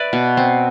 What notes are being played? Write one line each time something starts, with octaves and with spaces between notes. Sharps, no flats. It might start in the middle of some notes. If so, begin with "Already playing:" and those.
Already playing: B4 D5 E5
B2
C4